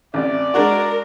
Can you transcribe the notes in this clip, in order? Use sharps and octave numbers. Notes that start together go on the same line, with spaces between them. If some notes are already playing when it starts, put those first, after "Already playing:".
A1 C3 D5
G#3 D4 F#4 A#4